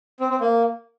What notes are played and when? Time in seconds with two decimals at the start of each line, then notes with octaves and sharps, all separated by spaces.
0.20 C4
0.30 C4
0.41 A#3